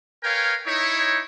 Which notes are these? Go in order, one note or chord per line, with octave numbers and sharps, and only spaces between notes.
A#4 B4 C#5 F5 G5 G#5
D#4 E4 C#5